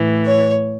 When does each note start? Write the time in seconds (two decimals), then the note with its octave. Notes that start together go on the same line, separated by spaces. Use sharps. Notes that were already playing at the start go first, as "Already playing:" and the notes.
Already playing: A2 E3
0.26 C#5